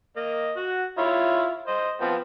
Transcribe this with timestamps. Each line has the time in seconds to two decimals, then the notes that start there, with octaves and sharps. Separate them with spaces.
0.16 A#3 D#5
0.56 F#4 F#5
0.98 E4 F4 C#5
1.67 C5 D#5
2.01 F3 B3 C4